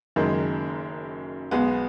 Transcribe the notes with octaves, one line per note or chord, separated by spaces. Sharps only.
F#1 F#2 D#3 G#3
B1 B2 G#3 B3